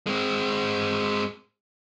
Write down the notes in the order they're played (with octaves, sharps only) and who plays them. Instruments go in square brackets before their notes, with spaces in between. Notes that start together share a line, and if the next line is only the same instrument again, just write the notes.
[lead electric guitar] G#3 C4